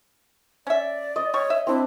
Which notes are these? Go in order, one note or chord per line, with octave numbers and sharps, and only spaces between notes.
C#4 D5 E5
D#5
G3 C#5 C#6
E5
C4 D4 E4